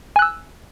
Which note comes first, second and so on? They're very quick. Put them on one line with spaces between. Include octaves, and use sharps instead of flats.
G#5 F#6 E6